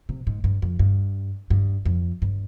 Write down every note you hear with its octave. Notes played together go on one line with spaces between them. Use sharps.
C3
G#2
G2
F2
G2
G2
F2
G2